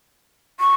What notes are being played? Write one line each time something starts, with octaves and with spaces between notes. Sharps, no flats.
C#6